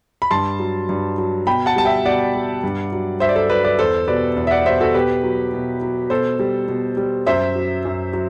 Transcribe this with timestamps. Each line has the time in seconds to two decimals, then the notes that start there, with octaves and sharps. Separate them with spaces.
0.22 B5
0.31 G2 A5 C6
0.60 F#3
0.89 G2
1.18 F#3
1.47 B2 G5 B5
1.66 F#5 A5
1.76 G3 A5
1.85 E5 G5
2.05 B2 D5 F#5
2.35 G3
2.63 G2
2.92 F#3
3.20 G2 C5 E5
3.29 D5
3.36 A4 C5
3.50 F#3 B4 D5
3.64 B4 D5
3.79 E2 A4 C5
4.08 B2 G3 B4 D5
4.36 E2
4.47 E5
4.51 D5 F#5
4.66 B2 G3 C5 E5
4.81 F#4 A4
4.94 B2 G4 B4
5.24 F#3
5.53 B2
5.82 F#3
6.10 B2 A4 C5
6.40 G3
6.68 B2
6.97 G3
7.27 F#2 C5 E5
7.56 F#3
7.85 F#2
8.13 F#3